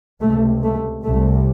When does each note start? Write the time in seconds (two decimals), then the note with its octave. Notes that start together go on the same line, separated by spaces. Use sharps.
0.22 C#2 C3 A3
0.64 A3
1.04 C2 C3 A3